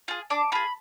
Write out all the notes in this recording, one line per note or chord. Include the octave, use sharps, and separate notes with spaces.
F4 G#4
D4 D6
F4 G#4 B5